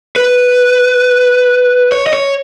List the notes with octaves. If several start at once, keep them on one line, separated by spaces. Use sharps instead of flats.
B4
C#5
D#5
C#5